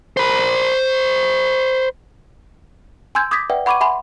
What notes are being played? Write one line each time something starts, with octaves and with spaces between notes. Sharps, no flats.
C5 B5
G#5 C6 E6 G6 G#6
D6 D#6 G6 G#6 A#6 B6
B4 D5 E5 F#5 G5
F#5 B5 C#6 D6 G#6 D#7
E5 F#5 G#5 B5 C6